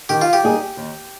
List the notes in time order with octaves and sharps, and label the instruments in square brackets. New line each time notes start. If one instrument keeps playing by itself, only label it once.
[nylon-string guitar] D#3 [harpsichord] G4
[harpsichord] F4
G4
[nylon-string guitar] G3 A#3 D#4 G#4
D#2